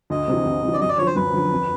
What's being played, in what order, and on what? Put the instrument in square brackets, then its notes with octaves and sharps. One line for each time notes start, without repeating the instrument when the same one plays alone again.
[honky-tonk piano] D2 [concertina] D#5
[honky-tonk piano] C3 E3
D2
C3 E3
[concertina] D5
[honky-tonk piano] F#2 [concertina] D#5
[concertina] D5
[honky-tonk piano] D3 F3 [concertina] C#5
[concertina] C5
[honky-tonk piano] F#2 [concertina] B4
[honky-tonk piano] D3 F3
F2